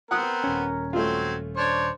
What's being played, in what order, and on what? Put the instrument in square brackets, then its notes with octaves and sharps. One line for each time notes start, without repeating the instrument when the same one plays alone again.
[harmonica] B3 C4 [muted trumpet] A#4 [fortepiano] F#5 D#6 F#6
[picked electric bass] D#1 C#4
[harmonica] F#3 C4 [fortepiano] A3 F4
[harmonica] D4 C#5 [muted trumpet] C5